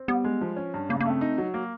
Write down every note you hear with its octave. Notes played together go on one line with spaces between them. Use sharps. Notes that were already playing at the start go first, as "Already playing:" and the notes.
Already playing: C4
G3 B3
G#3
F3
C#4
G2
C#3 A#3
A#3
A3
C4
D#4
F#3
A#3